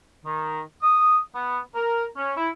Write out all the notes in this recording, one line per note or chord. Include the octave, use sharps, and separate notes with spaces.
D#3
D#6
B3
A#4
C#4
E4